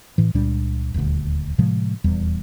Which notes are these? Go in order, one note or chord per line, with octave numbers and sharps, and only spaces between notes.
A2 E3
C#2 A#2 G3 D4
D#1 D2
A2 C3 F3 G#3
D#1 E2 G3